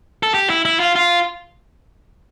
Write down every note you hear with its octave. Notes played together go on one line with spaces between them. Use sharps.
A4
G4
E4
E4
F4
F4